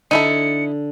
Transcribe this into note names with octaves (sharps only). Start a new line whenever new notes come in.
D3 D#4 E4 A4 C#7